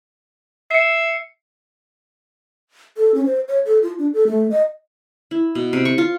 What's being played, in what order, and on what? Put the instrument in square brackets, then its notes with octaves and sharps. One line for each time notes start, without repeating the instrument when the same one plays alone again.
[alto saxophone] E5 [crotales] C7 C#7
[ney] A4
C#4
C5
C#5
A4
F4
D4
A4
A3
D#5
[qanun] E4
B2
C3
C#6
F4